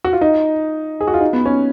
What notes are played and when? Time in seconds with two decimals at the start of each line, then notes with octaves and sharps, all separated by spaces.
0.04 F#4
0.13 F4
0.21 D#4
1.01 G#4
1.08 F#4
1.14 F4
1.21 D#4
1.33 B3
1.46 C#4